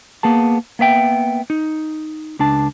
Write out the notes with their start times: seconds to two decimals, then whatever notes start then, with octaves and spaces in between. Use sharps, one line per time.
0.23 A#3 B3 G#4 A5
0.79 A#3 B3 E5 G5
1.50 D#4
2.39 C#2 D4 A5